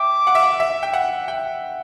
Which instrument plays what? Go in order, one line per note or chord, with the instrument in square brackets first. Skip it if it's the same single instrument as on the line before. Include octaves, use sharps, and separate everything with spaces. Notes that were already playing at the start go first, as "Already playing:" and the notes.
Already playing: [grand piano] E5 G5 [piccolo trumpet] D6
[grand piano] F#5
E5
F#5
E5
G5
F#5
G5